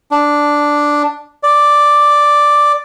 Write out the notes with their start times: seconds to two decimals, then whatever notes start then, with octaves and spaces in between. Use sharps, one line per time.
0.11 D4
1.43 D5